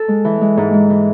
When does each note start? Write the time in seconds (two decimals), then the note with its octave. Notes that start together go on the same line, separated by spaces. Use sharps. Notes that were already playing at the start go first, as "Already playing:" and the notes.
Already playing: A4
0.08 G#3
0.25 E3
0.41 G#3
0.57 G#2
0.74 G#3
0.90 E3